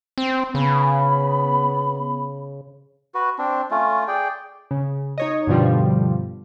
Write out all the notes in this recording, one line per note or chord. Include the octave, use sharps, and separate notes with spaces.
C4
C#3 B3 B5
F#4 B4
C4 D4
A3 C#4 F4
G#4 D5 G5
C#3
D#4 C#5 D#5
G2 B2 D3 F3 G3